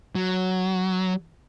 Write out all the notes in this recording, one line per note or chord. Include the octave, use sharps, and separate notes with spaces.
F#3